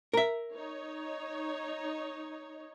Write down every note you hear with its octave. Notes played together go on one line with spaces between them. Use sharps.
A#4 E5
D#4 C#5